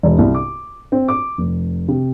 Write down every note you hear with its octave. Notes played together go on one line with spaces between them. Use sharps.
E1
C2
D6
C4
D6
F1
C3